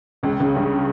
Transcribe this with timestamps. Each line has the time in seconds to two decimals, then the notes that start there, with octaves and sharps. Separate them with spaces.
0.23 C#2 C#3
0.40 C#2 C#3
0.56 G2